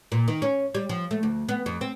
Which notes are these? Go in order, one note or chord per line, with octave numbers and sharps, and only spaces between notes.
A#2
D#3
C#4
G3
F3
A3
D2
B3
F2
C4